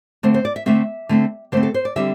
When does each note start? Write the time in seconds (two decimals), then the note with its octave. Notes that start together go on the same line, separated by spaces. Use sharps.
0.23 D3 A3 C4 C5
0.34 C5
0.45 D5
0.56 E5
0.66 D3 A3 C4 E5
1.09 D3 A3 C4
1.52 D3 A3 C4 C5
1.63 A4
1.74 C5
1.85 D5
1.96 D3 G3 C4 E5